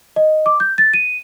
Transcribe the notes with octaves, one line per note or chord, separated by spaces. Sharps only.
D#5
D6
G6
A6
D#7